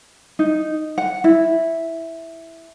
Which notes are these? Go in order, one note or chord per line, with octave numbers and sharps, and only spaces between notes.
D#4
F#5
E4